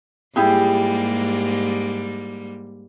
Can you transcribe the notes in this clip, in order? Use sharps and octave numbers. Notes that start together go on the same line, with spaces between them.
G#2 G3 A#3 E4 G4 G#4